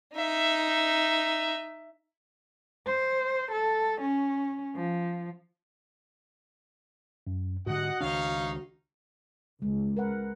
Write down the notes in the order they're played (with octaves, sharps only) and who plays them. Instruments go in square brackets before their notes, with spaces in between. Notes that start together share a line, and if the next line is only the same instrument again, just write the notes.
[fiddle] D#4 E5
[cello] C5
A4
C#4
F3
[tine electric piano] F#2
[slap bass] G#2 D3 [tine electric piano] F#4 [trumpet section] D#5 F#5
[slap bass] C#2 D#3 D4 [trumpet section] D#4 C#5 F5
[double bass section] C#2 [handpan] G#3
[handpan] A#4 B4 F#5